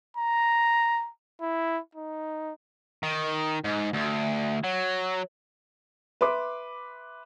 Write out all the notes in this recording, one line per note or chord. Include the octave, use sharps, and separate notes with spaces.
A#5
E4
D#4
D#3
G#2
D2
F#3
B4 E5 C6 D6